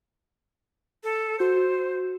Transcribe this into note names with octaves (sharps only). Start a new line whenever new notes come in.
A4
F#4 C5 G6